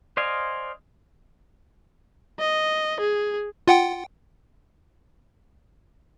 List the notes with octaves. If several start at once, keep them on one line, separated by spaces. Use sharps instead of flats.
C5 D5 D#5 F5 G#5
D#5
G#4
F4 F#5 G5